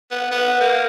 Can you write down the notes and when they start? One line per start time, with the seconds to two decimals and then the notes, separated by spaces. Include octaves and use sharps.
0.11 B3
0.32 B3
0.61 A#3